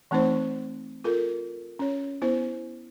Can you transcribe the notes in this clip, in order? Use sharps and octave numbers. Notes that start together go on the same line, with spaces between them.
E3 A3 C4 D#4 C5
F4 A4 A#4
C#4 C#5
B3 E4 C5